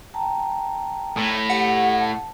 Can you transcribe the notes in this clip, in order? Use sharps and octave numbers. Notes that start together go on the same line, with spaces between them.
G5 A5 A#5
A2
G4 F#5
A5